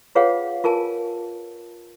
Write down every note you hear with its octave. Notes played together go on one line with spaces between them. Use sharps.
F4 G#4 B4 C#5 F5 F#5
F4 A#4 G#5 A5